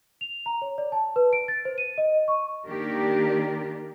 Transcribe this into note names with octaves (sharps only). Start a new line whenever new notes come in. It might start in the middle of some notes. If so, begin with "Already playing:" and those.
F7
A#5
C#5
D5
A5
B4
D7
A6
C5
D#7
D#5
C#6
D#3 A#3 D4 G4 A#4 D5